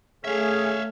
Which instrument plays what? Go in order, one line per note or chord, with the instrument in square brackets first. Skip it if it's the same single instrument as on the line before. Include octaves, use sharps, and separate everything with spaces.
[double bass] A3 [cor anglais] C#4 [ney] G#4 [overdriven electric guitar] E5 F5